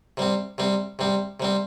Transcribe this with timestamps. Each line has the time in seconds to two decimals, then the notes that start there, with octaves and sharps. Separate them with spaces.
0.17 C3 G3 C4
0.58 C3 G3 C4
0.99 C3 G3 C4
1.40 C3 G3 C4